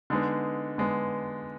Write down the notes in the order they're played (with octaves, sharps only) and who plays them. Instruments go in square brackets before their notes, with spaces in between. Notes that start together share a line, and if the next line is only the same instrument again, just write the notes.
[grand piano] D3 G#3 B3 D#4
D3 G#3 B3